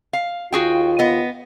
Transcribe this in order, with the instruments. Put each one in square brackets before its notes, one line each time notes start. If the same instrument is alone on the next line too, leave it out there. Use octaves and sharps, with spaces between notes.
[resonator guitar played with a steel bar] F5
[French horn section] D#2 F4 [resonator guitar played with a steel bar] F#4 G#4 G5
[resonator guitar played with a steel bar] B3 D#5